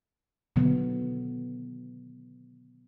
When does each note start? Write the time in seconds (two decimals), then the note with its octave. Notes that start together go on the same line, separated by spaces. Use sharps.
0.56 B2 D3 D#3 F#3 B3